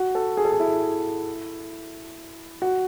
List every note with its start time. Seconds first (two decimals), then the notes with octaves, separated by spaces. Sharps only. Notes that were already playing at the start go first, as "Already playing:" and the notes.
Already playing: F#4
0.15 A4
0.37 G#4
0.45 A4
0.52 G#4
0.60 E4
2.62 F#4